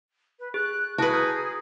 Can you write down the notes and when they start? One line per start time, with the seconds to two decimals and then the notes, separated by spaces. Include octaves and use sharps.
0.39 B4
0.54 G#4 F#6
0.98 E4 F#4 G#4 B4 A5
1.13 A#5 F6 G6